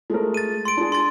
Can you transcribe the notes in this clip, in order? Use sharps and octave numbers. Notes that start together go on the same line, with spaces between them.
G#3 A3 A#4
A6 D#7
C6 D7
D4 G#4
C6 A6